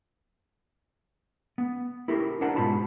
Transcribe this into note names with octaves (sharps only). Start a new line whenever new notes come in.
B3
E4 G4 A4 A#4
D4 A#4 C5 F#5 A5 A#5
G#2 B2 F4 A5 B5